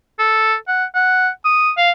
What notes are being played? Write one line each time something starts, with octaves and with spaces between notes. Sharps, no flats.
A4
F#5
F#5
D#6
F5